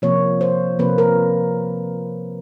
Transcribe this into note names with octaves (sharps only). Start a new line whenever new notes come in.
C3 F3 A#3 C#5
C5
C3 F3 A#3 B4
A#4